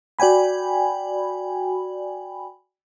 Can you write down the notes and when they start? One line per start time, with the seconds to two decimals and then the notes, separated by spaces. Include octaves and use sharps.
0.19 F#4 D5 G5 G#5 B5